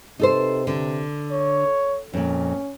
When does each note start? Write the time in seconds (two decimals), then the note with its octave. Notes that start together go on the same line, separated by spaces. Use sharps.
0.19 C3 D#4 A4 C5
0.67 D3
1.31 C#5
2.13 F2 A#2 C#4